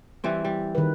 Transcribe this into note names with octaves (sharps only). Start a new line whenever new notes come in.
E3 G3 C4
G3
D#3 B4